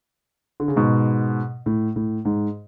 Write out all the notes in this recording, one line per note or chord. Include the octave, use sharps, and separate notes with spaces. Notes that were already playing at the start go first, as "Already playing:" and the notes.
D3
C#3
G#2 B2
A2
A2
G#2